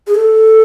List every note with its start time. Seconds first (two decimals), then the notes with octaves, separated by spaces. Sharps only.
0.07 G#4
0.15 A4